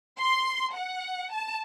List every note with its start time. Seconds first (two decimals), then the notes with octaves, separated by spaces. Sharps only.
0.19 C6
0.74 F#5
1.33 A5